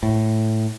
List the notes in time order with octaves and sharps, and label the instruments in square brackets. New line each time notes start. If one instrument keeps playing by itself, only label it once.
[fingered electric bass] A2